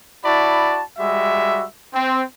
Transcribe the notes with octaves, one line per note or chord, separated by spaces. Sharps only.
E4 F#4 D5 A5 B5
G3 G#3 F#4 E5
C4